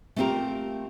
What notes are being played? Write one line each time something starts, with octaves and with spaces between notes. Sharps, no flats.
A3 B3 C4 F4 G4 A#4